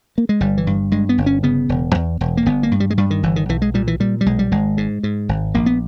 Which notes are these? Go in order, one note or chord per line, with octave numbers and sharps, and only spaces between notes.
A#3
G#3
G1 G3
E3
G2
G2 G#3
B3
G1
C#4
C#3 B3
E1
E2
E1
A#3
G1 B3
A#3
G2
G3
G#3
G2 G3
D#3
G1 E3
D#3
B1 E3
G#3
A#2 G3
E3
A#2 G3
G3
B1 G#3
G3
G#1 G#3
G#2
G#2
G#1
A#1 A#3
B3